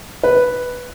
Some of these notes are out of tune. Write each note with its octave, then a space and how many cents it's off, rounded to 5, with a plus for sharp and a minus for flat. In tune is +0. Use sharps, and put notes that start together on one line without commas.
B4 +0